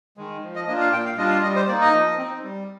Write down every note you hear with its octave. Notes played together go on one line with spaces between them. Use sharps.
D#3 G#3
F3
D#5
A#3 D4 F4 D#5
F5
A#2 G5
F5
G3 D4 F4 D#5
F5
G3 D#5
C5
A#3 D#4 D5
D#5
F3
C4 D#4
G3